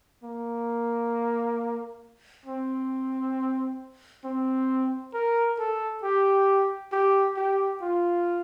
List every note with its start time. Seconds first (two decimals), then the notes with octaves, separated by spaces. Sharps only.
0.24 A#3
2.46 C4
4.24 C4
5.14 A#4
5.59 A4
6.03 G4
6.92 G4
7.37 G4
7.82 F4